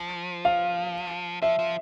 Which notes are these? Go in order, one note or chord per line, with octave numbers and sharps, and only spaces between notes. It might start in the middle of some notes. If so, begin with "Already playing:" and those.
Already playing: F3
F5
F3 E5
F3